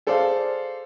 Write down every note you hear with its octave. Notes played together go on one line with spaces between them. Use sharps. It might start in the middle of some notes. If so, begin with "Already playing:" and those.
G#4 A4 C5 D5 F5